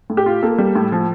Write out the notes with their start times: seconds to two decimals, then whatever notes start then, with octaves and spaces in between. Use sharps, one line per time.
0.10 A2
0.17 G4
0.26 F4
0.43 A#3 A4
0.58 G3
0.75 A2
0.92 F3